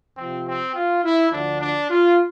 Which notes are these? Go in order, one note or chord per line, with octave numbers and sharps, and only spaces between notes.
F2 C3 F3 C4
C4
F4
E4
D2 D3 F3 D4
D4
F4